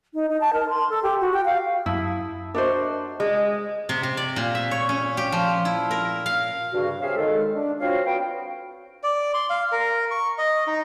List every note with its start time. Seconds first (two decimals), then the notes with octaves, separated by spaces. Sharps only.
0.14 D#4
0.29 D#4
0.41 A5
0.53 A#4
0.69 C6
0.90 A4
1.03 G4
1.21 F#4
1.33 G5
1.45 F5
1.86 F#2 E4 A5 D#6
2.55 D4 F#4 A#4 C5 D#5 E5
3.20 G#3
3.89 C3
4.03 C3
4.17 D5
4.36 A#2
4.55 E5
4.71 C#5
4.89 C#4
5.17 G4
5.32 F3
5.65 E4
5.91 A#4
6.26 F5
6.72 G2 C#3 F#4
7.00 C4 G#4 C#5 E5 F5
7.16 D#3 G#3 A4
7.54 D4
7.80 C4 C#4 F4 F#4 C#5 F5
8.06 B3 F#4 G5
9.03 D5
9.34 C6
9.50 F5
9.72 A#4
10.11 C#6
10.38 D#5
10.67 D#4